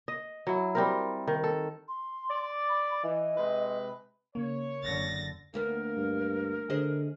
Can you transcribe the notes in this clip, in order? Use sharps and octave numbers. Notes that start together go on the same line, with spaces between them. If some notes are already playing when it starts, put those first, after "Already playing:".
D#5
F#3 E4
G3 C4 A#4
D#3
A4
C6
D5
B5
E3 D#5
C3 G#3 B4
C#3 A#3 C#5
F#1 D3 A6 A#6
D2 A#3 B3 A#4
G2
D3 G#4 C5 D#5